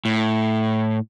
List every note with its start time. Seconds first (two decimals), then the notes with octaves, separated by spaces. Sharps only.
0.05 A2